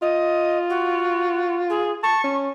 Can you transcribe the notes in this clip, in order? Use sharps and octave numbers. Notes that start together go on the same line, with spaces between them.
F4 D#5
F#4
G#4
A5 C#6
C#4